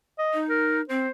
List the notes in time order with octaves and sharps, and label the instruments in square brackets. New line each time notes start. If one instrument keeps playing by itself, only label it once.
[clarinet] D#5
[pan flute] D#4
[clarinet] A#4
[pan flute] C4 [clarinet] C5